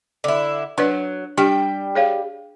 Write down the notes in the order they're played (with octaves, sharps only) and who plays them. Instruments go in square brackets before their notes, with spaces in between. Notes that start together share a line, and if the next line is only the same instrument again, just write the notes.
[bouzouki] D3 E4
[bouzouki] F#3 [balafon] D4 B4 D5
[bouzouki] G3 G5 [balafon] D4 G4
[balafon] G#4 C#5 F5